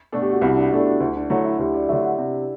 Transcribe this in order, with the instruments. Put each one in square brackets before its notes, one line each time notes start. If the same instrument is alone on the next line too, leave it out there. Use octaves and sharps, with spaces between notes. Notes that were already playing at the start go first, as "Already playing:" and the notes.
[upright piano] B2 A3 D4 A4
[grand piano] G4
F#4
[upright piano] C2 [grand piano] E4
[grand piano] D4
[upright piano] B2 A3 D4 A4 [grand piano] E4
[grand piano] F#4
[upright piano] D2 [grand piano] E4
[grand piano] D4
[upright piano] D3 F#3 A3 [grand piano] E4
[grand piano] E4
[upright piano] D2 [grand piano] G4
[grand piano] D5
[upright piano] D3 F#3 A3 [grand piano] E5
[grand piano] F#5
[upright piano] C3